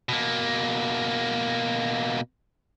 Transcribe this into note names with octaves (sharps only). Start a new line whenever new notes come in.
B2 A#3